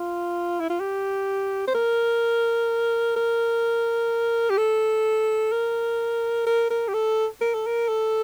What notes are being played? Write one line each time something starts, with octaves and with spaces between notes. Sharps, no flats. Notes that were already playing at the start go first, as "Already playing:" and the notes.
Already playing: F4
E4
F4
G4
C5
A#4
A#4
G4
A4
A#4
A#4
A#4
G4
A4
A#4
A4
A#4
A4